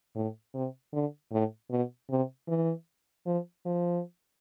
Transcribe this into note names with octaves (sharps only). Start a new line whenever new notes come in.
A2
C3
D3
A2
B2
C3
E3
F3
F3